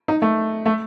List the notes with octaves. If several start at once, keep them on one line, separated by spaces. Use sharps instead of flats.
D#4
A3
A3